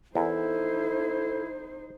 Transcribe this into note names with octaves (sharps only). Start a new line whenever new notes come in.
E2 D#4 E4 A4 C5